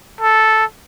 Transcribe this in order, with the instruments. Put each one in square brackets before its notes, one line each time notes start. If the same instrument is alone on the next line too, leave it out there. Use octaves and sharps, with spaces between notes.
[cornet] A4